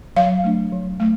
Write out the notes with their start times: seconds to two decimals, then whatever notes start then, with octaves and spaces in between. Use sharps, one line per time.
0.17 F#3 F5
0.44 A3 D4
0.72 F#3
1.00 A3